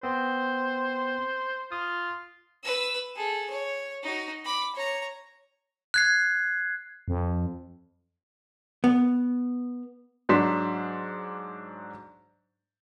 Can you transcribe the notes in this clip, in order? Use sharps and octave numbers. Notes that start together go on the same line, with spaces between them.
B3 C4 C5
F4 D#6
B4 E6
G#4 A4
C#5
D#4 F#4
B5 D6
C#5 A#5
F#6 G#6 C7
F2
B3
G#2 F#3 D4 C6 B6 E7